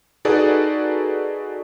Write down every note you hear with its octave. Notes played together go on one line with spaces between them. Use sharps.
D#4 F#4 G#4 A4 B4 D5